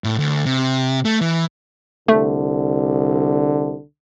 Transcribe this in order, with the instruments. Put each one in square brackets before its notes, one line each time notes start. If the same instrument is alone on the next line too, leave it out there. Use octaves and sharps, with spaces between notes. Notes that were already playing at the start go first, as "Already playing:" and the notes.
[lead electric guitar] A2
D2
C3
A3
E3
[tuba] C2 [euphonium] D3 [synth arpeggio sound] A3